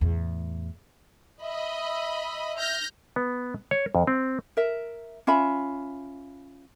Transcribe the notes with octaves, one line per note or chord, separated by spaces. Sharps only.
E2 A2
D#5 E5 B5
F6 G6 A#6
B3
C#5
F2
C4
A#4 E5
C#4 F4 E5 B5